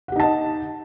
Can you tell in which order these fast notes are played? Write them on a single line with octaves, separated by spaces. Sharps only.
F#5 G4 D#4 A5 D#5